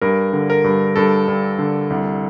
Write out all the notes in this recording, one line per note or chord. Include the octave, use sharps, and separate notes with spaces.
G2 A#4
D3
A#4
G2
G2 A4
G2
D3
C2